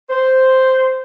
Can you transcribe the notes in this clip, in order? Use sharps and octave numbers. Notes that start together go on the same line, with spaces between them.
C5